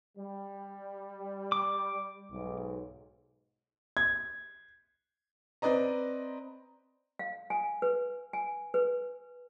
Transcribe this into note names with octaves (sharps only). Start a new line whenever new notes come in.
G3
D6
B1 G#2
G#6
C4 B4 D5 D#5 A#5
F5
G#5
B4
G#5
B4